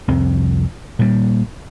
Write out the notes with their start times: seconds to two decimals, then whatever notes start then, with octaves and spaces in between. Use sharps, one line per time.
0.08 C2 F2 C4
0.99 A#2 G3